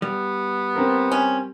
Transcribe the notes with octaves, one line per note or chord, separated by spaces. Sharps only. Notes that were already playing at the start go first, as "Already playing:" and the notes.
G3 B3
C4 A#4
C#4